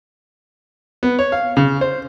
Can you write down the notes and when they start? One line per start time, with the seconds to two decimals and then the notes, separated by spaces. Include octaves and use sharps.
1.03 B3
1.19 C#5
1.32 F5
1.57 C#3
1.81 C5